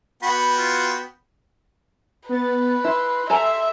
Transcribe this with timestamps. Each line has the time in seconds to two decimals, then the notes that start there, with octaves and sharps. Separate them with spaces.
0.23 B3 F#4 G5 B5
0.58 F4
2.29 B3 B4 A6
2.84 E4 C6
3.30 A4 E5 G#5 A#5